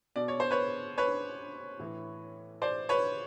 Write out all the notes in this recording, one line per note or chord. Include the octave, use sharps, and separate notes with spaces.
B2 D5
C#5
C5
B4 C#5
B4 C#5
A2 E3
C5 D5
B4 C#5